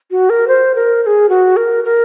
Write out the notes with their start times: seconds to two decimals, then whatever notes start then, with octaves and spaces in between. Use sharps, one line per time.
0.11 F#4
0.30 A#4
0.48 C5
0.75 A#4
1.03 A#4
1.06 G#4
1.29 F#4
1.56 A#4
1.84 A#4